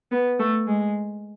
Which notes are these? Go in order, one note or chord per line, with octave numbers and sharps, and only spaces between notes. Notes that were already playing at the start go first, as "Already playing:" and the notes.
B3
A3
G#3